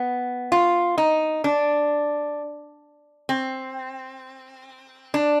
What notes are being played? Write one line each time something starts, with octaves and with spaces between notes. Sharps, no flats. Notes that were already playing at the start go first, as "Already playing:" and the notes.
Already playing: B3
F4
D#4
D4
C4
D4